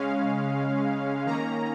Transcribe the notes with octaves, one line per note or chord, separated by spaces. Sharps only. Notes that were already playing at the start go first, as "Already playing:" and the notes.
Already playing: C#3 G#3 C#4 F5
D#3 A#3 C#4 A#5